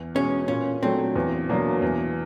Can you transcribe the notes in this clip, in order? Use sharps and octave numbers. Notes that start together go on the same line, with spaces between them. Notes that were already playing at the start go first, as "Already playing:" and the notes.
Already playing: E2
B2 G#3 C#4
A#2 C#4
F#3 A3 C4 D4
E2
B2 F#3 A#3 D4
E2